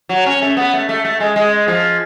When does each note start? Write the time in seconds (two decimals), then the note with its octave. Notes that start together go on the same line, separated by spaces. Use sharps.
0.09 F#3
0.26 C#4
0.42 A3
0.57 B3
0.73 A3
0.89 A3
1.05 A3
1.20 G#3
1.36 G#3
1.68 F3